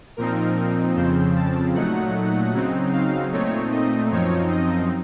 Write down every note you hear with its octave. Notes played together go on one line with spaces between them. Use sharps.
A#2 F3 C4 D#4 A#4
F2 C#3 F3 C4 C5
A5
A#2 F#3 A3 D#4 F#5
C#3 F#3 C4 D#4
F5
A#2 A3 C4 D#4 C#5
D#5
F#2 F3 C4 D#4 C#5
D#5